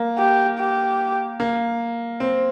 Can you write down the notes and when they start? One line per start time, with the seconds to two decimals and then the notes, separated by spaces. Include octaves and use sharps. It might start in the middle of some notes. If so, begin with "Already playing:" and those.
Already playing: A#3
0.18 G4
0.59 G4
1.40 A#3
2.20 C4